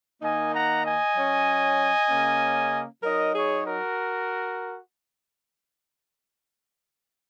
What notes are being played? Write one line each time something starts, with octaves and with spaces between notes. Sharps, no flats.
D#3 A#3 D#4 D#5 G#5
F#5 A#5
D#5 G#5
F#3 C#4
C#3 A#3 C#4
F#3 D#4 A#4 D#5
G#4 C#5
F#4 A#4